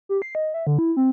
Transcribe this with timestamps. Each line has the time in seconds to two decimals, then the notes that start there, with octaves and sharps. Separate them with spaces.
0.09 G4
0.22 C7
0.35 D#5
0.54 E5
0.67 D3
0.79 E4
0.97 C4